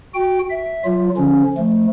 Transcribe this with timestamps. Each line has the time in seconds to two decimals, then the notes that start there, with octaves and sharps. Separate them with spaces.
0.14 F#4 G5
0.50 E5
0.85 F#3 F4
1.17 D3 F3 C#4
1.58 F3 A3